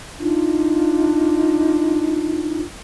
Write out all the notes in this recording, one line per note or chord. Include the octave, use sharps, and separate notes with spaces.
D4 D#4 F4